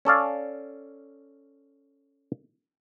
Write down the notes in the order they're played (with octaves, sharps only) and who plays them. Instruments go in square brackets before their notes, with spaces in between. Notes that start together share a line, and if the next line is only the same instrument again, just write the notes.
[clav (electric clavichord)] C#4 A4 D5 F5